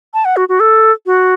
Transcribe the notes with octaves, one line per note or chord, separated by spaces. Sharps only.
A5
F#5
F#4
F#4
A4
F#4